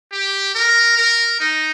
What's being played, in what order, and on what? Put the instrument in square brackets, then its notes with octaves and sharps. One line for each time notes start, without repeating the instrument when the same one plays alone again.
[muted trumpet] G4
A#4
A#4
D#4